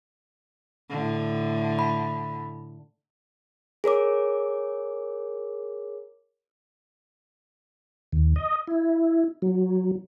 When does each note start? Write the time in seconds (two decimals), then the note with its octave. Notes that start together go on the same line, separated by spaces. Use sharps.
0.90 A2 D3
1.79 B5
3.84 G#4 A#4 C#5 D6
8.13 D#2
8.36 D#5
8.67 E4
9.42 F#3